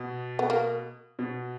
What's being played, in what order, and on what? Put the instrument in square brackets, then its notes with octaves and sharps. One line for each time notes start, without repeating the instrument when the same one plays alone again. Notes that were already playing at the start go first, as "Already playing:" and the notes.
Already playing: [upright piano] B2
[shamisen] B3
A#3
[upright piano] B2